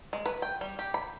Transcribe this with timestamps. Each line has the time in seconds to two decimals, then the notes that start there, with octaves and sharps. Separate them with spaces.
0.13 G#3
0.26 B4
0.42 G5
0.61 G3
0.79 G4
0.94 B5